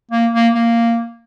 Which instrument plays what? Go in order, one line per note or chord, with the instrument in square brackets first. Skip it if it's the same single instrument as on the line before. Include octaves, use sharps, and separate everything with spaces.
[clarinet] A#3
A#3
A#3